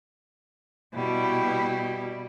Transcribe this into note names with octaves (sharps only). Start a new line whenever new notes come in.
B2 G3 E4